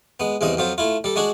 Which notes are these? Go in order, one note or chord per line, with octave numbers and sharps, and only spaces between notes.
G#3 B3
E2 G2 C#3 C4 D#5
F2 F#3 F4 C5
A3 E4 F4
G3 A4
G#3 D4 F#4 G#4